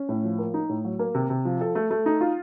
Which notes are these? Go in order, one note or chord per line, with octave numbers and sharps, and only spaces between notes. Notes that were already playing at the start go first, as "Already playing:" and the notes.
Already playing: C#4
A2
F3
A#3
D#4
A2
F#3
A#3
C3
C3
F3
A4
A3
A3
D#4
F4